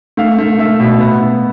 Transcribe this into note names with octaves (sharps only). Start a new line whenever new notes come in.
A3 F5
A3
A3 E5
B2
B3
B3